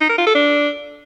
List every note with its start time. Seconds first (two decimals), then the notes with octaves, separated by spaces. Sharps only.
0.01 D#4
0.09 A#4
0.18 F4
0.26 A4
0.35 D4